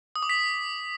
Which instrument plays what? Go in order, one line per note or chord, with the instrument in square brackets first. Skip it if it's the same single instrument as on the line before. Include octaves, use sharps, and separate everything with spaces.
[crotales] D#6
D6
B6